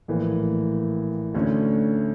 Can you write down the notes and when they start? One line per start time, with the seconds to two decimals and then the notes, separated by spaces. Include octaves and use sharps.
0.08 A#1 A2 E3 A#3
1.34 D2 D3 A3 C#4